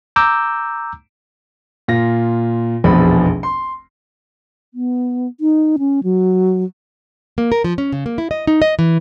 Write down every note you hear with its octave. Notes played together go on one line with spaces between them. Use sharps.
A#5 D6 E6 G6
A#2 F4 A#6
F1 A#1 E2 B2 F3 B5
C6
B3
D#4
C#4
F#3
A#3
A#4
F3
C#4
C#3
A#3
E4
D#5
D#4
D#5
E3